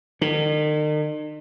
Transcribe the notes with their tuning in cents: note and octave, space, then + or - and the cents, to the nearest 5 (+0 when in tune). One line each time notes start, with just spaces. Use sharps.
D#3 -45